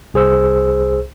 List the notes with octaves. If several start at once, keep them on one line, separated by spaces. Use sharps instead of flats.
C2 G#4 C5 E6